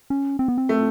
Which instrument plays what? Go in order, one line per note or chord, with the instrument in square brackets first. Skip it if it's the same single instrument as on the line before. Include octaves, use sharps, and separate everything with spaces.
[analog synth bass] C#4
C4
B3
C4
[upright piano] A3